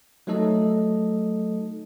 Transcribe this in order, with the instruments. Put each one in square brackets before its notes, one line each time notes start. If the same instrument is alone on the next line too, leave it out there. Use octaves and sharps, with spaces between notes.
[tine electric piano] F#3 A3 D#4 A4 D#5